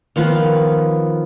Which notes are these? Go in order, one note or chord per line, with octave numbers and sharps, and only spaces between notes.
D#3 F3 B3 F4